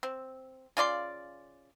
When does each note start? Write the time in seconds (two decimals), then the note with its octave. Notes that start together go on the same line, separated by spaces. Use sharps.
0.03 C4
0.77 C#3 F4 D5 C6